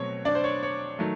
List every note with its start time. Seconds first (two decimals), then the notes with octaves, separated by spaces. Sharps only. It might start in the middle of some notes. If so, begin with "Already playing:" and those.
Already playing: B2 F#3 A3 C4 C#5
0.25 D4 D5
0.35 C5
0.44 C#5
0.63 C#5
0.99 D#3 F#3 A3